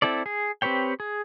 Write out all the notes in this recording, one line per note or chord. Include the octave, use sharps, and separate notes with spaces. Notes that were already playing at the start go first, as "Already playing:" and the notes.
C4 E4 A4 D5
G#4
C4 G4 B4 C#5 G5
G#4